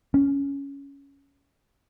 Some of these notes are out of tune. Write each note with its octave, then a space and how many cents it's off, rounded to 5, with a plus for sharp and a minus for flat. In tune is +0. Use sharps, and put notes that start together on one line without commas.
C#4 +10